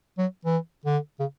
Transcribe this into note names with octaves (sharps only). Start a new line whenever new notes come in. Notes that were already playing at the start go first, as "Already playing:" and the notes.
F#3
E3
D3
C#3